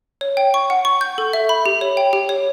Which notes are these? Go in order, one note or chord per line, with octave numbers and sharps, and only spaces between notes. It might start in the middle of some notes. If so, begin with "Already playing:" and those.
C#5
G5
C#6
F#5
C#6
G6
A4
E5
B5
G4
C#5
G5
G4
C#5